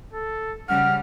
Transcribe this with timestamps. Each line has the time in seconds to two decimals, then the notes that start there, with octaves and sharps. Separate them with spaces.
0.13 A4
0.69 C#3 G3 F#5 F6